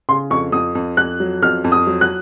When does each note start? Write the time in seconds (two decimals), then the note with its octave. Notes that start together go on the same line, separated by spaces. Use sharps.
0.09 C#3 C6
0.30 F2 C#6
0.52 F2 D#6
0.75 F2
0.97 F2 F#6
1.20 F#3
1.42 F2 F6
1.64 F2
1.72 D#6
1.87 F#3
2.01 F#6